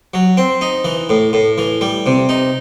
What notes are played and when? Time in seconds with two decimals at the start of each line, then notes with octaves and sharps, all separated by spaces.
0.14 F#3
0.37 C4
0.61 D#4
0.84 E3
1.09 A2
1.33 A2
1.58 E3
1.81 G3
2.06 C3
2.29 D#4